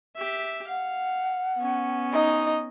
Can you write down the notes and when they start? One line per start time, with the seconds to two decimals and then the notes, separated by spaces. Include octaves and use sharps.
0.16 G4 E5
0.69 F5 F#5
1.57 B3 C#4
2.13 D#4 D#5